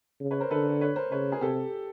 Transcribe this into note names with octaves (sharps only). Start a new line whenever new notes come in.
C#3
B4 C#5
A#4 C5
D3 A4 B4
B4 C#5
A#4 C5
C#3 B4 C#5
G#4 A#4
C3 G4 A4